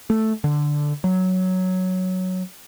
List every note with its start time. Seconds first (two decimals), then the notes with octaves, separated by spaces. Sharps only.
0.10 A3
0.44 D3
1.04 F#3